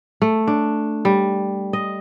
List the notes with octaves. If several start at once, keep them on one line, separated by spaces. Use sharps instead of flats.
A3
D4
G3
D#5